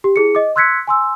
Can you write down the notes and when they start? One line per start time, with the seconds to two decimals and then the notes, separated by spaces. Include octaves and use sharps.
0.04 G4
0.16 E4 G#4 C#7
0.35 D#5 D6
0.56 C6 E6 F#6 G#6 B6 C#7
0.87 G#5 C6 E6